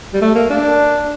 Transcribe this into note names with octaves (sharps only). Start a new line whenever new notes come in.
G3
A3
A#3
D4